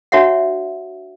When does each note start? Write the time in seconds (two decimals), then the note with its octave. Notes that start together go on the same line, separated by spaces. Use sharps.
0.12 D4 F#4 C#5 E5 F#5